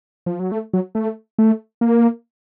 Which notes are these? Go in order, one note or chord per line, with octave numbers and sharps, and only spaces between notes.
F3
F#3
A3
F#3
A3
A3
A#3